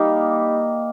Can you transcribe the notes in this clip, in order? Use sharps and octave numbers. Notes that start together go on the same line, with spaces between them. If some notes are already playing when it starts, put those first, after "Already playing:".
Already playing: G3 A#3 D#4